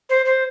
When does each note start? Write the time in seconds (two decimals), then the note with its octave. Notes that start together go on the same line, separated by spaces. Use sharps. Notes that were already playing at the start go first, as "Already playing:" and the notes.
0.09 C5
0.25 C5